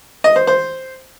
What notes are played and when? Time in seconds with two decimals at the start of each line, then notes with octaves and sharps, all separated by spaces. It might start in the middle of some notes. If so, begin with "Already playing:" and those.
0.24 D#5
0.36 C5
0.47 C5